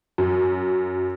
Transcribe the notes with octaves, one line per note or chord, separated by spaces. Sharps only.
F#2